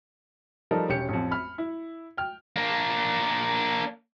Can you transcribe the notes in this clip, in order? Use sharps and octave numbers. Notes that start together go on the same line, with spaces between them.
F3 G3 D#4 A4 A#4 D#5
E1 C#4 G4 C#7
A1 F2
B5 F6
E4
G5 F6
A#3 D4